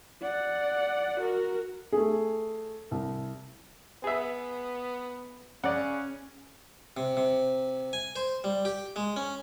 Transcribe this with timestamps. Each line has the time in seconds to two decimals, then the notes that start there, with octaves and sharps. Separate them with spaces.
0.22 D5 F#5
1.20 F#4 A#4
1.92 A3 G#4
2.91 C2
4.04 B3 G#4 E5
5.64 C#3 C#4 D5 F#5
6.97 C3
7.17 C3
7.93 G#5
8.16 C5
8.44 G3
8.65 G4
8.96 G#3
9.16 C#4